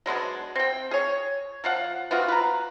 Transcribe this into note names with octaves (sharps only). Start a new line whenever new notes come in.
F#3 G#3 B3 D4
C4 G5
G#4 C#5
F3 F5 F#5
B3 C4 F4 F#4
B4 A#5